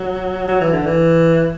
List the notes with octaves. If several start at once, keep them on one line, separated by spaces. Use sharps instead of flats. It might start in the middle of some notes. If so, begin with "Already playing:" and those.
Already playing: F#3
F#3
E3
D3
E3